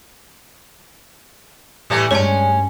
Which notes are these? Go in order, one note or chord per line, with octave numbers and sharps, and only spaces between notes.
A2 E3 G3 A3
G2 G3 G#3 C#4 C#5 A5